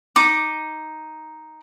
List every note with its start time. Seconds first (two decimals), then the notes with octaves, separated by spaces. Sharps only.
0.16 D#4 D6